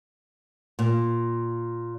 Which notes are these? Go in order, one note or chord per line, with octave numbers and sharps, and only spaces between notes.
A#2